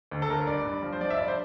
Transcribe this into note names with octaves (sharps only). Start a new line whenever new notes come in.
D2
A4
G1 A#4
G2 D5
G2
F3
C5
F3 D5
E5
G2 D5
C5